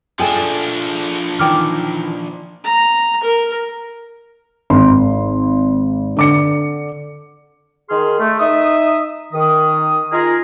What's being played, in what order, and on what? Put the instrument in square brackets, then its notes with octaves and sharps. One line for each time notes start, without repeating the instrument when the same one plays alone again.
[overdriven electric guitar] F3 D4 [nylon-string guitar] G#4 A4 E5 [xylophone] G5 G#5
[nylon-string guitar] D#3 E3 D#4 [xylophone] G5 D6 F6
[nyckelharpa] A#5
A#4
[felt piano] G#1 C6
D3 D6 C#7
[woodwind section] D#3 G#4 C6 F6
A3
D#4 E5 D#6
D#3 D#6
D#4 F4 G#4 A#4